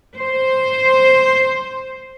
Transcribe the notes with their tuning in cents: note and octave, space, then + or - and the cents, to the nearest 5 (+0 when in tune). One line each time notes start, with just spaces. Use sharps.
C5 +0